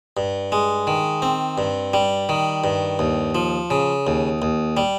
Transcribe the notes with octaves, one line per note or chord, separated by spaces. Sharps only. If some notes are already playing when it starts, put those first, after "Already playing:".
G2
G#3
D#3
C4
G2
G3
D#3
G2
D#2
F3
C#3
D#2
D#2
G3